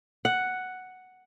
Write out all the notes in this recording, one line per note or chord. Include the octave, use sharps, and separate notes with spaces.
F#5